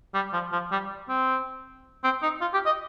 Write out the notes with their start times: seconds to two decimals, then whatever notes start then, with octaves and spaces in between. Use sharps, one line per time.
0.14 G3
0.33 F3
0.52 F3
0.72 G3
1.09 C4
2.04 C4
2.22 D#4
2.41 F4
2.54 G4
2.66 D#5